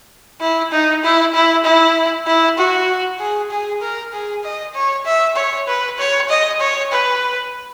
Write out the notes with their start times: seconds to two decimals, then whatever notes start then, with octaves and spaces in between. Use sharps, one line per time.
0.41 E4
0.72 D#4
1.03 E4
1.34 E4
1.64 E4
2.27 E4
2.58 F#4
3.19 G#4
3.51 G#4
3.81 A#4
4.13 G#4
4.43 D#5
4.74 C#5
5.05 E5
5.36 C#5
5.67 B4
5.99 C#5
6.29 D#5
6.60 C#5
6.92 B4